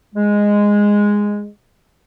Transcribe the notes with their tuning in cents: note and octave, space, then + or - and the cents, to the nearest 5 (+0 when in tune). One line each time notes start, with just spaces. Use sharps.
G#3 -10